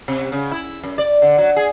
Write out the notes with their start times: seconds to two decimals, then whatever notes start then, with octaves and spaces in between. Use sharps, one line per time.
0.08 C3
0.32 C#3
0.51 E4
0.84 F#2
0.98 D5
1.22 D3
1.38 F#3
1.56 G#4